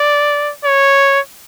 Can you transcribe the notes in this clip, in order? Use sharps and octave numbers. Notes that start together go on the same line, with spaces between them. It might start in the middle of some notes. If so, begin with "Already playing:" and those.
Already playing: D5
C#5